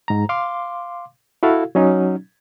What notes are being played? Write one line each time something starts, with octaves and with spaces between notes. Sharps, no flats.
G#2 A#5
F5 C6 D6
E4 F#4 A4 F5
F#3 C#4 D#4